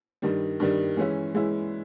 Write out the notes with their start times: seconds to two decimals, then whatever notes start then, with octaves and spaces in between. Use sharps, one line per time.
0.22 G2 D#3 G3
0.60 G2 D#3 G3
0.97 E3 G#3 C#4 E4
1.34 E3 G#3 C#4 E4